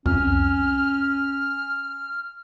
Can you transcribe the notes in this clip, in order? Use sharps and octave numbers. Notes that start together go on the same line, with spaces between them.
C2 F2 C#4 F6